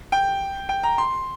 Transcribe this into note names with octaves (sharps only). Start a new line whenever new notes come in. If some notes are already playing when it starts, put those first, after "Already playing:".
G5
G5
A#5
C6